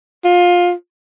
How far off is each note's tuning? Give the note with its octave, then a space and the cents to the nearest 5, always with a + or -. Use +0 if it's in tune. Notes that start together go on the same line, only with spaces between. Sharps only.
F4 +20